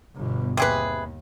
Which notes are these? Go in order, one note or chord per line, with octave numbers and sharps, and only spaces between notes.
G1 B2
D#2 C3 G#4 B4